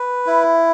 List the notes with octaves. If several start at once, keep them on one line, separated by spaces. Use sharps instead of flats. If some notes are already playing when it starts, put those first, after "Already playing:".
Already playing: B4
E4